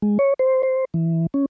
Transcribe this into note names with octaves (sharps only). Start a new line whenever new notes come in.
G#3
C#5
C5
C5
E3
C#4